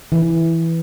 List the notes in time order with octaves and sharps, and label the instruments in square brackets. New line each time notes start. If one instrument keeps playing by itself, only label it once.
[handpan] E3